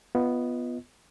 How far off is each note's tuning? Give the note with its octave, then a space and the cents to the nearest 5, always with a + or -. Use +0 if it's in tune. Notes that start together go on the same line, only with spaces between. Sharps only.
B3 +0 F4 -10 D#5 +15